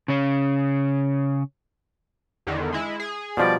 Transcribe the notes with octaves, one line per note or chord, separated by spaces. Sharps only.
C#3 C#4
E2 D3 D#3
G#3 E4
G#4
B2 F3 G3 D5